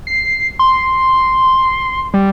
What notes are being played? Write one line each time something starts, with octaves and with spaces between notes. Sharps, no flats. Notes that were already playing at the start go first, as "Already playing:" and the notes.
C7
C6
G3